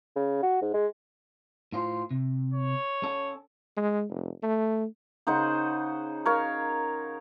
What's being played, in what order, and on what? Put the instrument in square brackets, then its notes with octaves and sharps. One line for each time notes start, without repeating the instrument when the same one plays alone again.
[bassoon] C#3
F#4
G#2
G#3
[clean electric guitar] A2 F4 C5
C3
[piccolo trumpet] C#5
[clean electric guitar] C#4 A4
[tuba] G#3
F1
A3
[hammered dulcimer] C#3 D#4 C5 F#5
A#4 C#5 F5